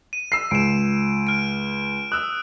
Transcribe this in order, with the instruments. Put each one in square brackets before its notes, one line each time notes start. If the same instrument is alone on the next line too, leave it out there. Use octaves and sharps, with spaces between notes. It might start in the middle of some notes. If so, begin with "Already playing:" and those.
[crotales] D#7
[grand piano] E6 C7
[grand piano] C#2 [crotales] D7 E7
[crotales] F6 D7
[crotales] D#6 [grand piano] E6 F#6